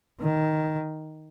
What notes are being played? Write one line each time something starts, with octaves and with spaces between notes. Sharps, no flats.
D#3